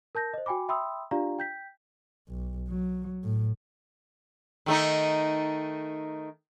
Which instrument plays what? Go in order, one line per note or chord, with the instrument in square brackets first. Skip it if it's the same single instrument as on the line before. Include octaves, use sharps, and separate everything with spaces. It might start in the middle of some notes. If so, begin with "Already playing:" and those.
[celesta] A#4 A5 G6 A#6
C5 D#5
F#4 G5 G#5 B5 D6
E5 G5 B5 C6 D#6 E6
D4 F4 G4 D5 F5 A#5
G5 G6 B6
[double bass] B1
F#3
A2
[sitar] D#3 A3 D#4